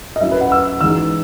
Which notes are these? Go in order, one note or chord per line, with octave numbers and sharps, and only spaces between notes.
D#5
F#3 C#4 E4 E5
B4
F#5
E6
E3 G#3 D#4 E6